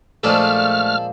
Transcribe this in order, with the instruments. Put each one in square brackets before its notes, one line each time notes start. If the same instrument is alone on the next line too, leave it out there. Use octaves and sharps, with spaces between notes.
[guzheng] A#2 F3 G#3 [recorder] A3 [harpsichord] D4 A4 [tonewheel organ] F6